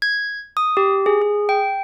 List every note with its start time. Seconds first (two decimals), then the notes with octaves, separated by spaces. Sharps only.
0.02 G#6
0.57 D#6
0.77 G4
1.06 G#4
1.22 G#4
1.49 G5